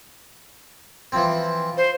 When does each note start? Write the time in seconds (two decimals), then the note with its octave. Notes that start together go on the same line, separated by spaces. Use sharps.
1.12 E3 F3 C4
1.77 C5